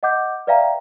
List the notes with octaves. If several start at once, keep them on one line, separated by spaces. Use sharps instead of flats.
D#5 F#5 D6 G6
B4 D5 E5 F5 G5 A#5